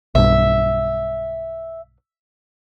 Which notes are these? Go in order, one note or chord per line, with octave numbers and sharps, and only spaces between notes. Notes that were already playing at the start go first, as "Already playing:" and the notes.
B1 G2 E5